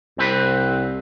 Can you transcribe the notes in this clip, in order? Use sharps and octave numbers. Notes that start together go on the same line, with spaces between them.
C2 C4 B4